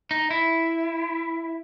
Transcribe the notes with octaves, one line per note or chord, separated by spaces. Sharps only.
D#4
E4